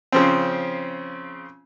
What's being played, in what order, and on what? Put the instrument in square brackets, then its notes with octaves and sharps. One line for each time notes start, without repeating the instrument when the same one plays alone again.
[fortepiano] C#3 F3 C4